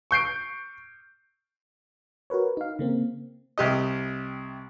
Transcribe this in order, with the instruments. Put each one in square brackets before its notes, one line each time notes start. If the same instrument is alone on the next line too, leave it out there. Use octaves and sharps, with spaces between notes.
[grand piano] C#6 G6 C7 D7
[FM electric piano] F#4 A#4 B4 C#5
D#4 F5
C#3 A#3 C4
[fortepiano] C2 G4 D#5